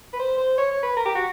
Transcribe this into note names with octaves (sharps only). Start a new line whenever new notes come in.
B4
C5
C5
C#5
C#5
B4
A#4
G4
F#4